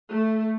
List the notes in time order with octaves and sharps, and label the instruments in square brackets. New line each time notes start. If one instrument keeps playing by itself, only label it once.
[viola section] A3